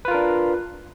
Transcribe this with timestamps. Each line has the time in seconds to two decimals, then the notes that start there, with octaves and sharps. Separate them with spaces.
0.05 B4
0.08 F4
0.11 A#4
0.14 D4